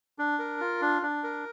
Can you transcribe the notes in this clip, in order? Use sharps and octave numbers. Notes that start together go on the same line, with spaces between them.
D4
A#4
F4
D4
D4
A#4